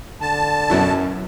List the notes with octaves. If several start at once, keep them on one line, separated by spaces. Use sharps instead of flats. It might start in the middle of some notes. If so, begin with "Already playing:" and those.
D3 A5
F#2 B2 F#3 E4